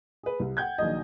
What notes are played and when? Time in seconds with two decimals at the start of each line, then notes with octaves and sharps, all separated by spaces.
0.23 G#4 B4
0.40 C2
0.57 F#5 G5 G6 G#6
0.78 A#1 D#3 F#3 D#5